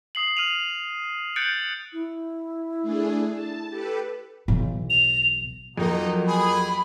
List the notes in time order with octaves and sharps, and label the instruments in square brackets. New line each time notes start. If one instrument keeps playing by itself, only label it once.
[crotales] D#6 C7 F#7
F6 D#7 F7
F#6 G6 A6 C#7 D7 F#7
[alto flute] E4
[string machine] A3 D4 G#4
A5
G4 A4 B4
[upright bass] B1 E3
[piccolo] F7
[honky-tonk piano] F2 A#3 [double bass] F#3 [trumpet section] D#4
[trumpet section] G#4 [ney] B5